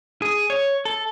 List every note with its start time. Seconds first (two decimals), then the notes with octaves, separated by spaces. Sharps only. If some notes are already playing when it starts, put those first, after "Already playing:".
0.22 G#4
0.50 C#5
0.85 A4